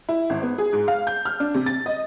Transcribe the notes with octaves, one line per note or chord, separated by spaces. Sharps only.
E4
G#1
B3
G#4
G#2
F5
G6
F6
D4
C3
A6
D#5